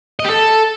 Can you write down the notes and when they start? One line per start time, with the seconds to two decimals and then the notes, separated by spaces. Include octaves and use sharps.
0.20 D#5
0.25 G4
0.30 A4